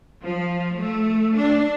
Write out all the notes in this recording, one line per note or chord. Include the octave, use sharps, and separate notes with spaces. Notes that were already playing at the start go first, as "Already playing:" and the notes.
F3
A3
D4